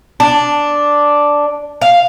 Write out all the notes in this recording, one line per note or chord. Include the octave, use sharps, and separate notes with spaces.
D4
F5